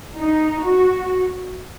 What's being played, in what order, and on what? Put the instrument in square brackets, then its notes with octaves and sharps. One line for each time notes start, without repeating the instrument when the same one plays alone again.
[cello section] D#4
F#4